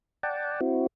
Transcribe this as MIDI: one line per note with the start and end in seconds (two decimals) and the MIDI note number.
0.23 0.61 74
0.23 0.61 78
0.23 0.61 79
0.23 0.61 81
0.61 0.87 60
0.61 0.87 64
0.61 0.87 66